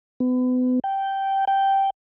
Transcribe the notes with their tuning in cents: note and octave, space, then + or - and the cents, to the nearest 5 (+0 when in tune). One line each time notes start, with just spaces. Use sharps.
B3 +35
G5 -10
G5 -5